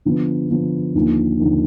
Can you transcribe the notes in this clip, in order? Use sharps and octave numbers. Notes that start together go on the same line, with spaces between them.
D3 F3 B3
D3 F3 B3
D#2 D3 F3 A#3
D#2 D3 F3 A#3